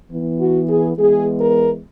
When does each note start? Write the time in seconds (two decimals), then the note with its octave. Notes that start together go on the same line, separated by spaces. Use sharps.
0.11 E3 B3
0.39 F#4
0.69 G#4
0.96 E3 G#3 B3 G#4
1.39 A#4